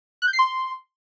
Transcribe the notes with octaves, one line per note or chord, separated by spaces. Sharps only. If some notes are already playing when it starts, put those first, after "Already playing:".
F#6
G6
C7
C6